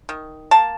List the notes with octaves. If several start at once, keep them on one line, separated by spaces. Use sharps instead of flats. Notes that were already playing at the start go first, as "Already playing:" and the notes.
D#3
A#3 A5